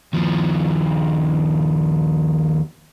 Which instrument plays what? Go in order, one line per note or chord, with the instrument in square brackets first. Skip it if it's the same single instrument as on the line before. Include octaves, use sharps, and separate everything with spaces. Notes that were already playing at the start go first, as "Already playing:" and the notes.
[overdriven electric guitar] D#2 F3